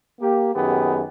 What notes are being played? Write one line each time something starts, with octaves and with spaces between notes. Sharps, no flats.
A#3 G4
F#2 D#3 B3 G4 G#4